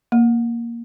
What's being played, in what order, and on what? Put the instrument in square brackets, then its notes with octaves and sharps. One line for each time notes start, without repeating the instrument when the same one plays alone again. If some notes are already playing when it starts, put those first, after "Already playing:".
[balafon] A#3